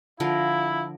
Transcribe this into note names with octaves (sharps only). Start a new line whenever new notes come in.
D3 F3 E4 F4 A#4